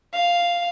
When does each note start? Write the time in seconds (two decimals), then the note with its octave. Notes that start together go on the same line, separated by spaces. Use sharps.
0.13 F5